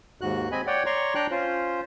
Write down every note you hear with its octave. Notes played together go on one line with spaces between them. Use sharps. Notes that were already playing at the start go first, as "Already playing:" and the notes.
D#2 G#2 F#4 F#6
C4 D#5 G#5 B5
C#5 D5 F#5 G5
C#5 D5 A#5 C6 C#6
D4 G5 A#5 F#6
C#4 F4 C5